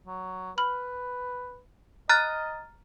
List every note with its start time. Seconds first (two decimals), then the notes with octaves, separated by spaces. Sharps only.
0.07 F#3
0.58 B4 B5 F6 F#7
2.09 D#5 A#5 F6 F#6 A6